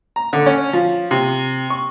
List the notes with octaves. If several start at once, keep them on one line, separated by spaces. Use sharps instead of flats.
A#5
D3
C#4
F3
C3
C#6